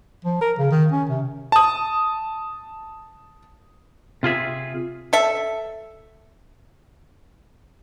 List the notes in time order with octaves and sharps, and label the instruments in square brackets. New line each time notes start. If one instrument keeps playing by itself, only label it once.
[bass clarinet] F3
A#4
C#3
D#3
C#4
C3
[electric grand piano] A5 D#6
[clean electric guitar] C3 F4 G#4 E5
[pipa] A4 E5